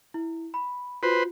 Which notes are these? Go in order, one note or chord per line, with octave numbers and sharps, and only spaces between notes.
E4
B5
F4 F#4 B4 C5